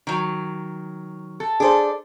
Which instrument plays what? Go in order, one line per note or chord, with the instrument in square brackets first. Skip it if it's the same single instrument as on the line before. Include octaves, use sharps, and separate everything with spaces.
[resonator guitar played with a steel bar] D#3 F#3
A4
[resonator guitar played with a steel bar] D4 A4 [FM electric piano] G#4 C5